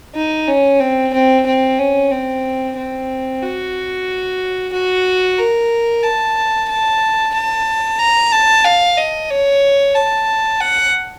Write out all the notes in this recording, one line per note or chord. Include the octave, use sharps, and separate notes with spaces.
D#4
C#4
C4
C4
C4
C#4
C4
C4
F#4
F#4
A#4
A5
A5
A5
A#5
A5
F5
D#5
C#5
A5
F#5